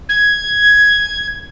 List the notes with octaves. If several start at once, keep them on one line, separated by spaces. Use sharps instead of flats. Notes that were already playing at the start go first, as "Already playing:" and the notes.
G#6